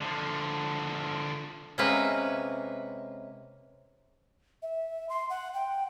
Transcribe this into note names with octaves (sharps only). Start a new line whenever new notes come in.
D3 F3
C3 G#3 A#3 C#4 B4 E5
E5
C6
F#5
G5